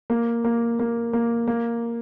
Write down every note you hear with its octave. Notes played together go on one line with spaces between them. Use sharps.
A#3
A#3
A#3
A#3
A#3